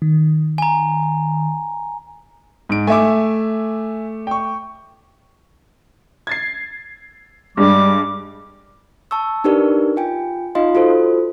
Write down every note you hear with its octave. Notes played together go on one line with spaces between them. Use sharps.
D#3
G#5 A#5
G#2 D7
A3 E5 G#5 D6
G5 C#6
G#6 A6 C7
G2 G3 G#3 D6
A5 C#6 E6
D4 D#4 G4 A#4 B4 D5
F4 G5 G#5
D#4 F4 D#5 F5 C6
F4 F#4 A4 C5